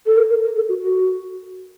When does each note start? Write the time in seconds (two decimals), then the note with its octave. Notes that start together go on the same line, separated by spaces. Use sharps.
0.06 A4
0.17 A#4
0.29 A#4
0.43 A#4
0.56 A4
0.69 F#4
0.82 F#4